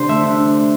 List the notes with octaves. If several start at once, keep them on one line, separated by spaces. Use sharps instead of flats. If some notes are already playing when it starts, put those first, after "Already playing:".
Already playing: D3 C4 G4 C5
A3 E5
D4